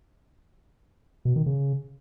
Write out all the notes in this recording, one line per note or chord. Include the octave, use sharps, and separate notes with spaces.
B2
D#3
C#3